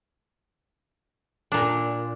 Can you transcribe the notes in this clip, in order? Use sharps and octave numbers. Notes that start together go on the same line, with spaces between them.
A#2 D4